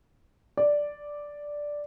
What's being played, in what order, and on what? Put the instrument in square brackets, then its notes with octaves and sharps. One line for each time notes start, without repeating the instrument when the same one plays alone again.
[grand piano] D5